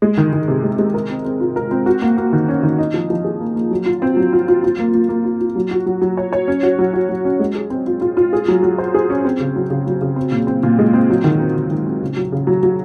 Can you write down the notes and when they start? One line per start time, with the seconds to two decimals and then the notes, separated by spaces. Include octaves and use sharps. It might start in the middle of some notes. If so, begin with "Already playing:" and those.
0.02 G#3
0.17 D#3
0.33 D#3
0.48 C3
0.64 G#3
0.79 G#3
0.94 A#4
1.10 C4
1.25 C4
1.40 F4
1.56 A#4
1.71 C4
1.86 F#4
2.02 A#3
2.17 A#3
2.33 D#3
2.48 C#4
2.63 D#3
2.78 D#4
2.94 F3
3.10 F3
3.24 G#4
3.40 A#3
3.56 A#3
3.71 F#3
3.86 F4
4.02 C4
4.17 F#3
4.33 F4
4.48 F4
4.64 F4
4.79 A#3
4.94 A#3
5.09 A#3
5.25 F4
5.41 F4
5.56 F#3
5.71 F#4
5.86 F#3
6.02 F#3
6.17 C#5
6.33 C#5
6.48 C#4
6.63 F#4
6.79 F#3
6.93 F#4
7.09 F#3
7.25 C#4
7.39 G#3
7.55 G#4
7.70 C4
7.87 F4
8.01 F4
8.17 F4
8.33 G#4
8.48 F#3
8.63 F#3
8.78 C5
8.94 G#4
9.10 C#4
9.25 C4
9.40 C#3
9.56 F#3
9.70 C#3
9.87 F#3
10.02 C#3
10.16 C4
10.32 A#2
10.47 C4
10.63 A#2
10.79 G#3
10.93 C4
11.10 F#3
11.24 D#3
11.40 C4
11.56 D#3
11.71 D#3
11.87 C4
12.02 C#3
12.17 F#3
12.32 C#3
12.47 F#3
12.63 F#3